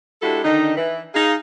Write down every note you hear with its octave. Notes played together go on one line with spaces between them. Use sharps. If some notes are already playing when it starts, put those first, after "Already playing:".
G#3 D4 E4 F#4 G4 A4
D3 D#3 D4 D#4
E3
D#4 G#4 F5